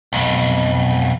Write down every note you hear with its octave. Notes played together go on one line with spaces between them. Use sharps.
B1 F2